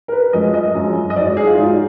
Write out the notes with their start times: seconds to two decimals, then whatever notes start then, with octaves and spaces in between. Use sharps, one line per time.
0.08 A#4
0.12 B4
0.33 F#2 F3 G#3 D#5
0.54 D#5
0.74 F#2 F3 G#3
1.10 D#5
1.16 G#2 F#3 D5
1.37 G#4
1.47 F4
1.58 G#2 F#3 D#4